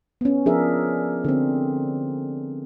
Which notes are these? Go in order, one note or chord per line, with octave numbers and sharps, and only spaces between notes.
B3 C#4
F3 D4 G#4 A#4 E5
D3 C4